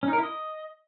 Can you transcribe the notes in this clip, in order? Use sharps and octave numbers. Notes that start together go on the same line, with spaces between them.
C#4
D#4
A#4
E4
D#5